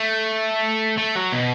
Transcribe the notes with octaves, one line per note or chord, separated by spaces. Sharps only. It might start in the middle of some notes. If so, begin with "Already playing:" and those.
Already playing: A3
A3
F#3
B2